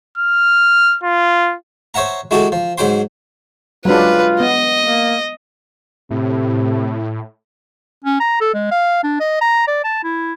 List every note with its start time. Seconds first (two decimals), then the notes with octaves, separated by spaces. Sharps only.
0.18 F6
1.04 F4
1.94 C5 C#5 E5 F#5 A#5
2.31 G#3 E4 F#4 G4 A4
2.52 F3
2.78 G#2 F#3 C5 G5 C6
3.85 F#3 G#3 D4 F4 B4
4.40 B3 D#5
4.80 A#3
6.11 A2 C3
8.04 C#4
8.20 A#5
8.41 A4
8.54 G#3
8.71 F5
9.03 D4
9.20 D#5
9.41 A#5
9.67 D5
9.84 A5
10.04 E4